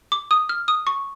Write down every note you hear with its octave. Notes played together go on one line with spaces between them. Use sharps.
D6
D#6
F6
D#6
C#6